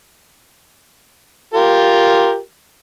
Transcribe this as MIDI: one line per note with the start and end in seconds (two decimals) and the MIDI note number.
1.53 2.39 65
1.53 2.39 67
1.53 2.39 70